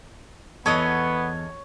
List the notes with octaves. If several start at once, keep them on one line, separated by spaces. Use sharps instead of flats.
E2 B3 A4 C#5 D#5